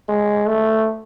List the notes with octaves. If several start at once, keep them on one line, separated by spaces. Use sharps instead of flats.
G#3
A3